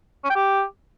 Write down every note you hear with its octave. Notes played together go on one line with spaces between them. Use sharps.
C#4
G5
G4